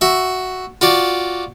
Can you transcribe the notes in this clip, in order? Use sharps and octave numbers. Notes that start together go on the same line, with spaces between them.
F#4 E5
F4 F#4 D5